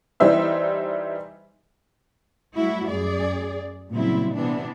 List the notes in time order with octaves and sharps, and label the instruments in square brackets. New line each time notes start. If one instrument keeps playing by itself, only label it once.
[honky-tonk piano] E3 G3 D#4 C5 E5 E6
[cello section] F#3 G3 A3 E4 F#4
F#2 G#4 D5
A#2 C#3 F#3 G3 C4 E4
C3 E3 B3 D4